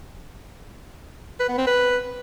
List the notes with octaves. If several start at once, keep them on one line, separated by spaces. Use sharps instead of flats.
B4
B3
C4
B4